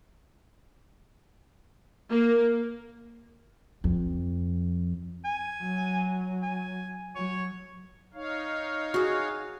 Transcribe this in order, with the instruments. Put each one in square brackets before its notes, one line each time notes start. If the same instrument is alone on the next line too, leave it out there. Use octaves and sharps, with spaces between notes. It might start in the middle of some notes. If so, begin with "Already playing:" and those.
[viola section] A#3
[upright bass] F2
[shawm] G#5
[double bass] F#3
[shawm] G#5
[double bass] F#3 [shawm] C#5
[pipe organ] D#4 C#5 F5
[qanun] F#4 G#4